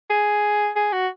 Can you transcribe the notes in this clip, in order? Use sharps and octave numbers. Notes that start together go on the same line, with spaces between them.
G#4
G#4
F#4